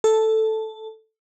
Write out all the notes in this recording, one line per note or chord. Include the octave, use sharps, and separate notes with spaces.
A4